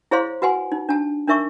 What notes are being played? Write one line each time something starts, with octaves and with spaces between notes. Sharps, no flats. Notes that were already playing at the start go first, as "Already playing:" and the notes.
E4 G#4 C5 C#5 F5 C6
F#4 B4 F#5 G#5 C6
D#4
D4 A5
D4 D#4 A#4 E5 C#6 D6